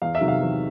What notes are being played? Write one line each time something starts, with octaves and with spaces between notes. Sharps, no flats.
E2 F5
E5
C3 D#3 F#3
F5
E2